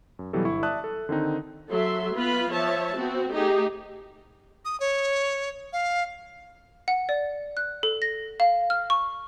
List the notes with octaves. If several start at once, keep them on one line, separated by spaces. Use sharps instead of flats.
F#2
B2 E3 F#3 G3 G4 A4
G1 E4 C#6
D5 E5 A5 D#6 F#6
A4
D3 D#3 C4 D#4
F#3 A4 E5 C6
B3 F4 B4 B5
F3 C#5 E5 A5
B3 C4 F#4
A3 D#4 G4 G#4
D#6
C#5
F5
F#5
D5
F#6
A4
A#6
F5
F6
C#6